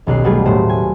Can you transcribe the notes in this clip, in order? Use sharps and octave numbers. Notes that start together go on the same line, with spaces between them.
D#1 B1 F#6 C7
F#3 G3 A3 B3 F4 G#4
D#1 A2 A3 C5
G#5